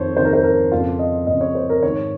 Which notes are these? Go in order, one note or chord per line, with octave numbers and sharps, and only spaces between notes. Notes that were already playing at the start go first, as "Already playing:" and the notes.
Already playing: F2 D#3 C5 C#5
F2 D#3 C5
A#4
C5
A#4
F2 C#3 F4
D#5
F2 C#3 D#5
C#5
C5
A#4
G#2 D#3 C#5